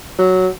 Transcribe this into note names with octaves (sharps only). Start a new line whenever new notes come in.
F#3